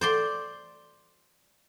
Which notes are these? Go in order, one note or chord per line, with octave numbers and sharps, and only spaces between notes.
C5 D5 C6